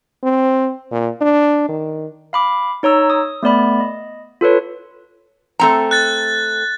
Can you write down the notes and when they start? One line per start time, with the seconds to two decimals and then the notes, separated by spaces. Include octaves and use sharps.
0.23 C4
0.91 A#2
1.21 D4
1.68 D#3
2.33 F5 B5 D6
2.83 D#4 C#5 A#5 E6
3.10 D#6
3.43 A3 B3 D5 B5
3.80 D#5
4.41 F4 A4 B4 C#5
5.59 A3 C4 A#5
5.91 F#6 A6